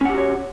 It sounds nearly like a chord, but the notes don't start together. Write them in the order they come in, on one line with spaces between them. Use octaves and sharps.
C#4 F#5 G4 F#4 C#5